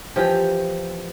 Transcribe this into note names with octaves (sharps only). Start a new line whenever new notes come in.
E3 F3 G4